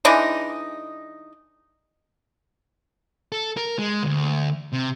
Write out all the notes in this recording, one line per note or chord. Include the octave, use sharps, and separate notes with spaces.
E3 G#3 D4 D#4
A4
A#4
G#3
D2
C3